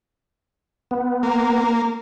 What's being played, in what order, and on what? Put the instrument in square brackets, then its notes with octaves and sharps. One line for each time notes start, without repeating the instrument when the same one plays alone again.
[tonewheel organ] B3
[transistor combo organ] A#3